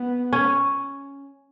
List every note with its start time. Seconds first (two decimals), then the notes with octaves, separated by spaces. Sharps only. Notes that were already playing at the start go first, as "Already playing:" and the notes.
Already playing: B3
0.33 C#4